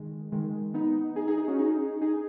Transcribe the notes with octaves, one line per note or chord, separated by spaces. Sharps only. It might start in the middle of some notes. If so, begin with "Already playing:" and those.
Already playing: D#3 G#3
D#3 G#3
B3 D#4
D#4 G#4
D#4 G#4
D#4 G#4
C#4 F#4
D#4 G#4
D#4 G#4